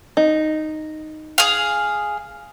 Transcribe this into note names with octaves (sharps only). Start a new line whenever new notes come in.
D#4
G#4 F5